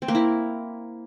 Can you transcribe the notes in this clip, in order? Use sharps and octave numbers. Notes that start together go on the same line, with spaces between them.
C4
A#3
E4